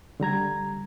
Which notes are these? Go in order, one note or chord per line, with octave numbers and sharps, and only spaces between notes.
D3 G3 A#5 G#6